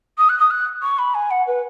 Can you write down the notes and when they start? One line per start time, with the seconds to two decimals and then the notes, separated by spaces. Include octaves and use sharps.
0.18 D#6
0.29 F#6
0.39 D#6
0.50 F#6
0.82 C#6
0.98 B5
1.14 G#5
1.31 F#5
1.47 B4